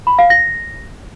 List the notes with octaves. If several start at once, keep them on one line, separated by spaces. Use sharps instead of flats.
B5
F5
A#6